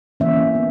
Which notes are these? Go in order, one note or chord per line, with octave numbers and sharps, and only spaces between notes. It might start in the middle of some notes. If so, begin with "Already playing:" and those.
E3 A#3 C#4 E5
B3